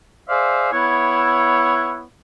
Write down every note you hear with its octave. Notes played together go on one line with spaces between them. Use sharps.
G#4 C5 D5 E5 F5
B3 E4 C#5